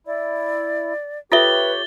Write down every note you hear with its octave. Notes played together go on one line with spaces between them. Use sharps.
E4 D5
F4 G4 A4 B4 C#5 E5 A6 G7